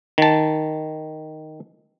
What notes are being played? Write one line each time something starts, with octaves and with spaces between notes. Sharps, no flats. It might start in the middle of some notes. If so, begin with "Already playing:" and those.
D#3 A5